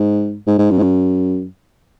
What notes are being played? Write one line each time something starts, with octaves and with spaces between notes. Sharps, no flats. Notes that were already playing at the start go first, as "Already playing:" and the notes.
Already playing: G#2
G#2
G#2
F#2
G#2
F#2